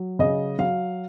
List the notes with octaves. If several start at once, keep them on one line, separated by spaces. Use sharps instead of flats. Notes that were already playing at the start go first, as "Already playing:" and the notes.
Already playing: F#3
C#3 D#5
F#3 F5